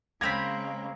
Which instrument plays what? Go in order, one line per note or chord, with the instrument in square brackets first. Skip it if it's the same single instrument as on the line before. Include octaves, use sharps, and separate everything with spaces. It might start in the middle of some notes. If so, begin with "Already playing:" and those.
[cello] C#3 G#3 [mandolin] A#3 C4 B5 [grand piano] G#6 A#6 F7